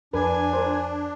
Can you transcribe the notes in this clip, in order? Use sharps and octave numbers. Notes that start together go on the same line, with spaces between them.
F2 D4 A#4 B4 G#5
A#4 C5